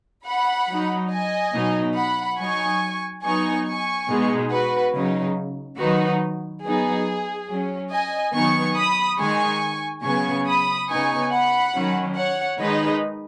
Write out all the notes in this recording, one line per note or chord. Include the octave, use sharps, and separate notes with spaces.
F#5 B5
F#3 D#4
D#5 G#5
B2 F#3 D#4
F#5 B5
F#3 D#4 G#5 C#6
F#3 B3 D#4 G#5 C#6
G#5 C#6
B2 G#3 B3 D#4
F#4 B4
C#3 F#3 D#4
D#3 F#3 D#4 F#4 B4
F#3 B3 D#4 G#4
F#3 C#4
D#5 G#5
D#3 F#3 B3 D#4 G#5 C#6
B5 D#6
D#3 G#3 D#4 G#5 C#6
C#3 F#3 B3 G#5 C#6
B5 D#6
C#3 B3 D#4 G#5 C#6
F#5 B5
D#3 F#3 C#4
C#5 F#5
D#3 G#3 D#4 B4 D#5